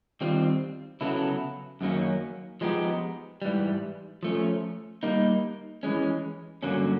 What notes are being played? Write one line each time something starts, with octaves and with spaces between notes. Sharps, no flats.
D#3 G3 C4 F4
C#3 F#3 B3 E4 A4
F#2 D#3 F#3 A#3 C#4
F3 G#3 B3 D#4 G4
G#2 E3 G3
F3 A3 C#4
G3 A#3 D#4
E3 G#3 C#4
G2 D3 F#3 A#3 C#4